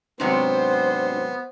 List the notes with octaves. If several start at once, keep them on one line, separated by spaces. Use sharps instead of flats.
G#2 C3 F#3 B3 D4 C5